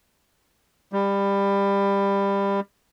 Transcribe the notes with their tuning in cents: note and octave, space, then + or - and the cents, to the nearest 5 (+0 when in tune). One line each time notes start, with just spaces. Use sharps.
G3 +20